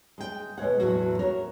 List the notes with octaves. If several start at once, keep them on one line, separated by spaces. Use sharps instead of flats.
G#3 G5
B2 G#3 C#5 F#5
E2 A2 F#3 F#4
F#4 A#4 C#5